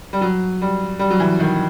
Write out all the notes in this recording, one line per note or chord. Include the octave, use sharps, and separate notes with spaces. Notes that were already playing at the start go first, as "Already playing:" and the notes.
G3
F#3
G3
G3
F#3
E3
D#3